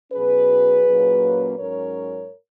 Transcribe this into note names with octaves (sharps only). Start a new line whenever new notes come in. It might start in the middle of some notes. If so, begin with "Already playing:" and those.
B2 F#3 C#4 G#4 B4
A#2 F#3 A#3 C#4
G#2 F#3 C#4 A#4 C#5